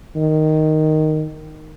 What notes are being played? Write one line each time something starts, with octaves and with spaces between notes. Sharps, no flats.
D#3